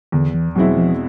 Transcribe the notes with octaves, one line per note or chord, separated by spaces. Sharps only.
E2 D3
E3
B2 F#3 G#3 C4 E4
F3